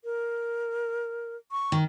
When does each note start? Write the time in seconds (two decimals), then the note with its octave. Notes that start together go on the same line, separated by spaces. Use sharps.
0.04 A#4
1.52 C#6
1.72 D#3